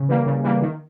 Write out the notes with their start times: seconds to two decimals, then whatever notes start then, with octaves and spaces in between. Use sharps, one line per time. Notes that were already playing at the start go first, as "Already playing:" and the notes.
Already playing: C#3
0.09 E3 G3 A#3
0.26 C#3
0.44 E3 G3 A#3
0.62 D#3